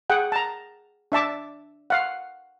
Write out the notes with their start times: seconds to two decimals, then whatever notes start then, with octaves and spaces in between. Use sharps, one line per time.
0.10 G#4 F#5 G5
0.32 A5 A#5
1.12 D4 E5 A5 D6
1.90 F5 F#5